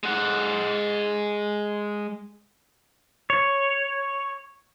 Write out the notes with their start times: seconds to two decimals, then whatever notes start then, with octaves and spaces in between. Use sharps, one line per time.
0.03 G#3 F#5
3.30 C#5